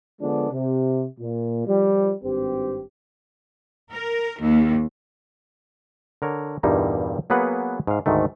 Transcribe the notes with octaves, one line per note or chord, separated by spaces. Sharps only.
D3 F3 G#3 B3 D4
C3
A#2
F3 G3
G#1 G2 C4 G4
A#4
D#2
D3 A#4 C#5
E2 G2 A#2 G3 A#3 D#4
F#3 A#3 B3 G#4 B4 F#5
G#2 F5
D2 G#2 D#3 A3